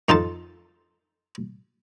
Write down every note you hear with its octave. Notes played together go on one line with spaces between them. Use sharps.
F2 D#4 F4 A4 A5